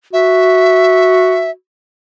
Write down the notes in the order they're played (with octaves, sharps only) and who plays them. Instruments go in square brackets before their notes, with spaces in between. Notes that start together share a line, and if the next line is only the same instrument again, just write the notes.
[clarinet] F#4 [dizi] E5